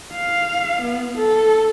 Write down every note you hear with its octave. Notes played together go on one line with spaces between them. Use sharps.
F5
B3
A4